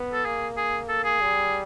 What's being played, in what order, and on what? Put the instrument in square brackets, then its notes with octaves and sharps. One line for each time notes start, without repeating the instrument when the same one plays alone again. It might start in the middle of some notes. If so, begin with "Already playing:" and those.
Already playing: [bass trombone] B3
[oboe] A4
[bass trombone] A#3 [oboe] G#4
[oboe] G#4
A4
G#4
[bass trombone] G3